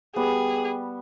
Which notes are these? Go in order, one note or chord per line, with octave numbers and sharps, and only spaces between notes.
G3 B3 G#4